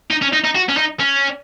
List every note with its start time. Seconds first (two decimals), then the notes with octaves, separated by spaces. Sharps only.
0.11 D#4
0.22 C#4
0.33 D#4
0.44 D#4
0.55 F#4
0.69 C#4
0.77 D#4
1.00 C#4